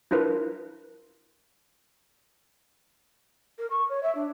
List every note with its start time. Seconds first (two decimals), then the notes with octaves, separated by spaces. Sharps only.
0.11 D4 E4 F4 A#4 B4
3.58 A#4
3.70 C#6
3.89 C#5
4.03 E5
4.15 D4